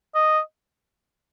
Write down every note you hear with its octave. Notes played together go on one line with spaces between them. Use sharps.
D#5